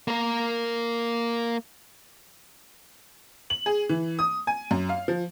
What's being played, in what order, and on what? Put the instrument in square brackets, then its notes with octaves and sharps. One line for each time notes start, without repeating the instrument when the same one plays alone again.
[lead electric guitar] A#3 A#4
[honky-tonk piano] F#7
G#4
E3
D#6
G#5
F#2
F5
F3